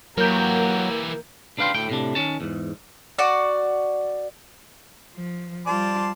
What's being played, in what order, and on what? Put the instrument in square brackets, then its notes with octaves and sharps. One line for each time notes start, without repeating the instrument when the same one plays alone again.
[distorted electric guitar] E3 G4 [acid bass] F#3 [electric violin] A#3 A#5 [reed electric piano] A#4 G6
[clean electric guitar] C#2 D4 B4 F5 G5 C6
D2 A2 G5
A2 C3 D4
D#3 C#4 A5
E2 G#2
[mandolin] F#4 D5
[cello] F3
[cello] G3 F4 [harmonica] C5 D5 A5